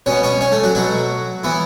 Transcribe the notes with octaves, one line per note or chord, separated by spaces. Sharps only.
B2 B3 C#4 C#5
C#4 C#5
C#4 C#5
A3 A4
F#3 F#4
B2 F#3 A3 F#4
E3 B3 E4